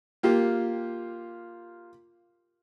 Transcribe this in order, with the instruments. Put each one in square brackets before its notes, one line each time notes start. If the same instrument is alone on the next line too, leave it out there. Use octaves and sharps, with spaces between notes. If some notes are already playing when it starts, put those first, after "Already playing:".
[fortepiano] A#3 F4 G4